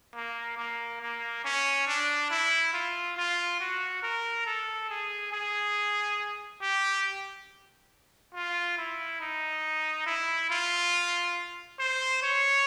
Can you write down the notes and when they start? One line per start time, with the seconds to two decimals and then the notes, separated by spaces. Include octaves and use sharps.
0.15 A#3
0.58 A#3
1.01 A#3
1.44 C#4
1.87 D4
2.30 E4
2.74 F4
3.17 F4
3.60 F#4
4.03 A#4
4.46 A4
4.89 G#4
5.32 G#4
6.61 G4
8.34 F4
8.77 E4
9.20 D#4
10.06 E4
10.50 F4
11.79 C5
12.22 C#5